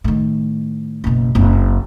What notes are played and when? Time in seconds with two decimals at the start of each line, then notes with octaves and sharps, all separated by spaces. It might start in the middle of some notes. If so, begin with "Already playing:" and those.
0.04 A2 D#3
1.04 F#1 B2
1.35 F#1 C4